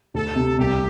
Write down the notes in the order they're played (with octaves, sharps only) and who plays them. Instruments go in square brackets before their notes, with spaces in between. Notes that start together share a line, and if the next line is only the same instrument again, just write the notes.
[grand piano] D2 [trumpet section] A4
[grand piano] C3
[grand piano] C2 [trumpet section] G4